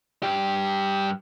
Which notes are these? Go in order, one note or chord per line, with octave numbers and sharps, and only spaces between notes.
G2 G4